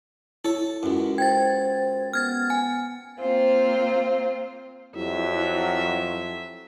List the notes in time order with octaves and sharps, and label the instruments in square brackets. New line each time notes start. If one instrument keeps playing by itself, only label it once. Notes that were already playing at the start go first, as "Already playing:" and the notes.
[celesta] E4 [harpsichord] A4 C#5
[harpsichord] C#2 F#2
[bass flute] C5 [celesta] G5 [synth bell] G#6 A6
[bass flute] B3 [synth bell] F6 G#6 A6
[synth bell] G#5
[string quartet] A#3 C4 F4 C5
[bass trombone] F2 [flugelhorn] F#3 [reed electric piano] E4 G4 [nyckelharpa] E5